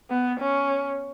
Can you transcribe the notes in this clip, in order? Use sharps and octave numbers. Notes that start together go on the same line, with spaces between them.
B3
C#4